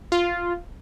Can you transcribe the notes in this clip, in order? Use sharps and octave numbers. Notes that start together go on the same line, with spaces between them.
F4